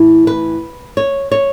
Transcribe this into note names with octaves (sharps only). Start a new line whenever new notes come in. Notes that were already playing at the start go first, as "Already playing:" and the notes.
Already playing: A2 E3
B4
C#5
C#5